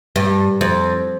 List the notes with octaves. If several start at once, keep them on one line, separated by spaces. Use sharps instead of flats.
G2
F2